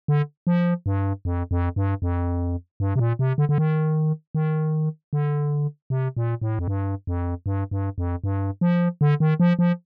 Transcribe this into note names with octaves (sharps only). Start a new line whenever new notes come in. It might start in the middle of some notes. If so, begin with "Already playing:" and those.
D3
F3
G2
F2
F2
G2
F2
G2
C3
A#2
C3
D3
D3
D#3
D#3
D3
C3
A#2
A2
F2
G2
F2
G2
G2
F2
G2
F3
D3
D#3
F3
F3